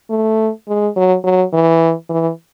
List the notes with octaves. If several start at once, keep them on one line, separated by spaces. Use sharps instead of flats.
A3
G#3
F#3
F#3
E3
E3